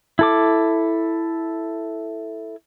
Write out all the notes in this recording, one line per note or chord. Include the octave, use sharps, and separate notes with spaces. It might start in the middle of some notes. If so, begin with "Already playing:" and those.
E4 A4 D6